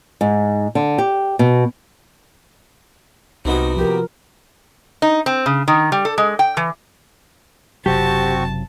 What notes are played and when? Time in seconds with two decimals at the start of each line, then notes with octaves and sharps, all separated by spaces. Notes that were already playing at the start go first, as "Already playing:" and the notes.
0.21 G#2
0.75 D3
0.98 G4
1.39 B2
3.45 C2 C3 B3 D#4 F#4
3.77 F3 G4 A#4
5.02 D#4
5.26 C4
5.46 C#3
5.68 D#3
5.92 G3
6.05 A4
6.18 G#3
6.39 G5
6.57 E3
7.86 F#1 C3 F#3 C4 F#4 G4 A5 C#6